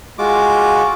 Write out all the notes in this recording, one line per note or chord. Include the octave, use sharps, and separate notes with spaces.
G#3 F4 F#4 D6